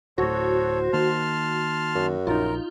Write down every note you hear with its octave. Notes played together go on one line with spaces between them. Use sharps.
D1 A2 F#4 A4 C5 C#5
D#3 A#3 A5 C6 F6
F#2
A#1 D#4 F4 A#4